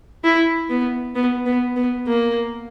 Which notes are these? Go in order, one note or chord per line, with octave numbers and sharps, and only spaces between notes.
E4
B3
B3
B3
B3
A#3